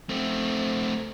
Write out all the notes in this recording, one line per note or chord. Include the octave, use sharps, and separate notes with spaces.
A3 C4